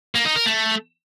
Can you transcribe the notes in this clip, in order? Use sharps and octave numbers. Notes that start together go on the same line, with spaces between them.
A#3
D#4
A#4
A3